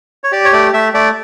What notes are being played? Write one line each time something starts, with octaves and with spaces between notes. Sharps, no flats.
C#5
G4 D5
C#5
A3 D5
A3 E5
A3 D5